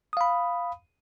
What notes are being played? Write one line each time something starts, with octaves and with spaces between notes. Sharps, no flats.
F5 B5 D#6